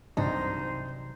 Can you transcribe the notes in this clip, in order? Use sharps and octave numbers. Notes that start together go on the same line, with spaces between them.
C2 G2 C3 E3 F#3 D#4 C5